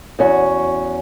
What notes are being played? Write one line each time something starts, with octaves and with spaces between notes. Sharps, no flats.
E2 C#4 F#4